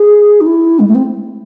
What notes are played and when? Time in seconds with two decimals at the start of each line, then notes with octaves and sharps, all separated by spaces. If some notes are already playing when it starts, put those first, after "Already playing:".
Already playing: G#4
0.41 D#4
0.46 E4
0.79 G#3
0.87 A3
0.95 C4